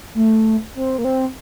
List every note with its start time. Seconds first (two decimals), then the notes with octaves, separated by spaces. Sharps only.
0.15 A3
0.75 C4
0.98 A#3
1.05 C4